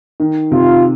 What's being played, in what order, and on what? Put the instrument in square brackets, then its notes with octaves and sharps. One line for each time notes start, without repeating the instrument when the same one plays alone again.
[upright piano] D#3
[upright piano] C3 [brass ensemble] F4